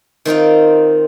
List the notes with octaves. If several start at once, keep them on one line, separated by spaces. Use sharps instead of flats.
D#3 C4 D#4 F4